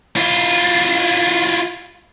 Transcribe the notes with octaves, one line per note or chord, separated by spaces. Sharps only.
E4 F4